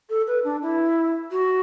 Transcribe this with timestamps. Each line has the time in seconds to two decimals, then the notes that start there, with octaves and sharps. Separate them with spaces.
0.09 A4
0.27 B4
0.44 D4
0.62 E4
1.31 F#4